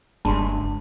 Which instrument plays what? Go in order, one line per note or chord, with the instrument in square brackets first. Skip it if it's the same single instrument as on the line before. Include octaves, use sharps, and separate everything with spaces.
[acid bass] F#1 [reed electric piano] G2 G#3 D4 [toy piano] A5 C6